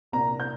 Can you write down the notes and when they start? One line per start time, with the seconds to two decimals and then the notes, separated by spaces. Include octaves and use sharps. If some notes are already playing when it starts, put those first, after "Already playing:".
0.12 C2 A#2 A#3 D4 A#5
0.40 G6